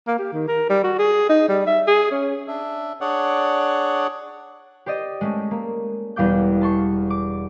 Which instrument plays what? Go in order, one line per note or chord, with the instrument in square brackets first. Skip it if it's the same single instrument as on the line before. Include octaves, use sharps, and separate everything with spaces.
[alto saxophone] A#3
G4
D#3
A#4
G3
F#4
G#4
D#4
G3
E5
G#4
C#4
[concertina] D4 E5
D4 G#4 C#5 D5 F#5
[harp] G4 C5 D5 D#5
G#3 A3 C#4
A#3
E1 E2 G3 F5 D6 G6
A5 C6 C#6
D6